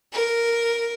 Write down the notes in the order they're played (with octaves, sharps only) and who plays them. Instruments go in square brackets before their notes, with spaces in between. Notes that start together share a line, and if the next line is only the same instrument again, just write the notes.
[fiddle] A#4